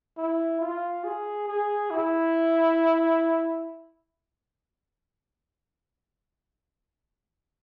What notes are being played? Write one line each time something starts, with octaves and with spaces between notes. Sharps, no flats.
E4
F4
G#4
G#4
E4